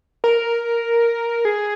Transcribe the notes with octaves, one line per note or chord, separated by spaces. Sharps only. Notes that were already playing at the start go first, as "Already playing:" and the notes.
A#4
G#4